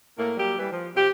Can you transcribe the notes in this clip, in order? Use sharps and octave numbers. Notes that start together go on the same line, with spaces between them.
A2 A3 A#3
F#3 G3 A#3 G4
E3 G3
F3
C3 F3 G4